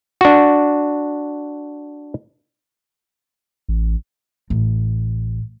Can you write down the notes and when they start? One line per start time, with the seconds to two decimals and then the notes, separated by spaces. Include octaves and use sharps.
0.21 D4 F#4
3.69 A1
4.50 A1